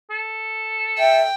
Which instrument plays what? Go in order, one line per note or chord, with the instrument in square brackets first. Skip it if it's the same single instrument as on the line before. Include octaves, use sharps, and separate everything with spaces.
[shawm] A4
[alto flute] E5 [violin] G5